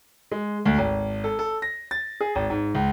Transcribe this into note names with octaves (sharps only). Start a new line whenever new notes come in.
G#3
D2
G#1
A4
A4
A#6
A6
G#4
G#1
G#2
C#2